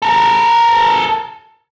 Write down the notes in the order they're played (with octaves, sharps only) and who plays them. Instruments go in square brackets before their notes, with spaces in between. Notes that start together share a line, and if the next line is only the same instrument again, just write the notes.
[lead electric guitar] A4 A#4